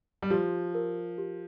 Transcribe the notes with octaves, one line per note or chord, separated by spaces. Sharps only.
G3
F3 G4
A#4
G4